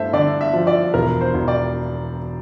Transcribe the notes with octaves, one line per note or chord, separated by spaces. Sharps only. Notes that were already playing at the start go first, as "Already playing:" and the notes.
Already playing: G2 A3 C5 E5
D3 D5
E5
F3
D5
E1 A#4
C5
E1
D5